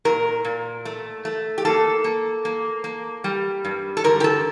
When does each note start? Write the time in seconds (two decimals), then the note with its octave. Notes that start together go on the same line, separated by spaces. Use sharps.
0.05 A#2 A#4
0.45 A#2
0.85 A3
1.25 A3
1.58 G4
1.65 A#3 A4
2.04 A#3
2.45 A#3
2.84 A#3
3.24 G3
3.65 G2
3.97 A4
4.04 D3 A#4
4.20 G4
4.24 A4